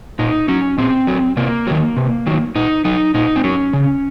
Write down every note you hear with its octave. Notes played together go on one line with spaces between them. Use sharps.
A#2 D#4
F#3 C#4
A#2 C4
F#3
C3 A#3
D#3 F#3
C3
D#3 F#3
A#2 D#4
F#3 D#4
A#2 D#4
C4
F#3 C#4
C#3